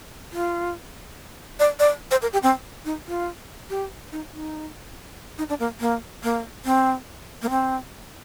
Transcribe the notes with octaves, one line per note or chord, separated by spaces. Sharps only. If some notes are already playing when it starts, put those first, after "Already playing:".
F4
D5
D5
C5
A#4
G4
C4
D#4
F4
G4
D#4
D#4
D#4
D4
A#3
A#3
A#3
C4
A#3
C4